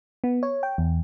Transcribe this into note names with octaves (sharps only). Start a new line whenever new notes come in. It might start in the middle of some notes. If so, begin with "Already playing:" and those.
B3
C#5
G5
E2